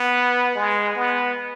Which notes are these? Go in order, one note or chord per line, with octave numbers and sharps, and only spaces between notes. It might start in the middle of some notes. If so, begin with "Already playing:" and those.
Already playing: B3
G#3
B3